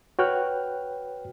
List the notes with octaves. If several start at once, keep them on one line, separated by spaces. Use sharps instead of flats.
F#4 B4 C#5 G5 F6 F#6